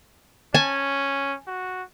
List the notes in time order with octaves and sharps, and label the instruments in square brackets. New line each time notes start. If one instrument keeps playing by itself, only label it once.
[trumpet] C#4 [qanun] G#5 A5
[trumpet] F#4